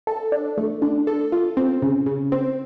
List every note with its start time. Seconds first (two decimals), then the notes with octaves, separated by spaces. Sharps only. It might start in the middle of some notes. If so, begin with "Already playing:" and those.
0.07 A4
0.32 D4
0.58 A3
0.82 D4
1.07 A4
1.32 F4
1.57 C4
1.82 C#3
2.06 C#3
2.32 C4